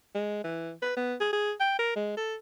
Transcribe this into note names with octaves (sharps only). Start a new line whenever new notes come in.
G#3
E3
B4
B3
G#4
G#4
G5
A#4
G#3
A4